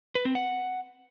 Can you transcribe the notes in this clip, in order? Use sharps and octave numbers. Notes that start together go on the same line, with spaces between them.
B4
C4
F#5